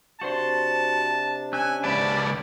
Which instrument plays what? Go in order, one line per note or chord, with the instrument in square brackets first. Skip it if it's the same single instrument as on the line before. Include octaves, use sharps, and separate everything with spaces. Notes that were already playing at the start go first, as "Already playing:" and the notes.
[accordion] C3 D4 [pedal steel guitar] F#4 C5 C6 [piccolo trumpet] A5
[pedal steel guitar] C#4 E6 F#6 [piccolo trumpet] G#5
[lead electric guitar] C#2 D5 [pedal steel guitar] A5 [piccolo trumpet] B5